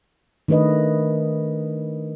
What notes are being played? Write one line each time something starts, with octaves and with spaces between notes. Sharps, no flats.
D#3 A3 D4 B4 D#5